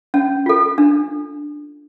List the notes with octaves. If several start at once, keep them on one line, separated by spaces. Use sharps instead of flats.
C#4
F4 A4
D4